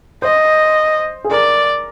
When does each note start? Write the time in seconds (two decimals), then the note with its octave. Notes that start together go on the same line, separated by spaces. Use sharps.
0.22 C5 D#5
1.24 G#4
1.31 A#4 D5